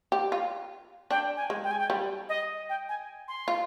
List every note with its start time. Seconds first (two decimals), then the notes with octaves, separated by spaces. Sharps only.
0.12 G4
0.32 F4
1.11 D4 G5
1.37 G#5
1.50 G#3
1.64 G5
1.71 G#5
1.79 G5
1.90 G3
2.29 D#5
2.69 G5
2.89 G#5
3.28 C6
3.48 F4